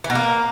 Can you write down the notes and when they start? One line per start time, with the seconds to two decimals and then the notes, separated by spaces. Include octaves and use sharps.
0.04 E3
0.10 B2
0.15 A#3